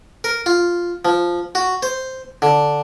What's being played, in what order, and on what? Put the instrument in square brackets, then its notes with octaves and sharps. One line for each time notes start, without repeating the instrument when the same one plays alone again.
[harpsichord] A#4
F4
F3
F#4
C5
D3